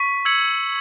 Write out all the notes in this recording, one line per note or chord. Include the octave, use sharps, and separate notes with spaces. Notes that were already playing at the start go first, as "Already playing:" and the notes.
Already playing: C#6 B6
E6 G#6 C#7 F#7